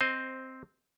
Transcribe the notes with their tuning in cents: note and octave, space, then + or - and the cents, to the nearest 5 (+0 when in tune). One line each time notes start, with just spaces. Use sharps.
C4 +0 C5 +5 D#5 +0